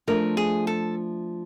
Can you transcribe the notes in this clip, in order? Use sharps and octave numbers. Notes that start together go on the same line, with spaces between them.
F3 A3 D4 A#4
G#4
A4